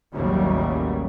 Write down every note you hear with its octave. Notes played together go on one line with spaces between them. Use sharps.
A1 D#2 C#3 E3 F#3 G3